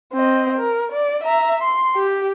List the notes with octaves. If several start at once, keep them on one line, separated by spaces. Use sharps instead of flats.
C4 D#5
A#4
D5
E5 A#5
C6
G4